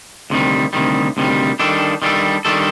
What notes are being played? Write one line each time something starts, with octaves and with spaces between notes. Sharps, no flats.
D2 C3 D#3 G3
D2 C3 D#3 G3
D2 C3 D#3 G3
D#3 G3 D4 A4
D#3 G3 D4 A4
D#3 G3 D4 A4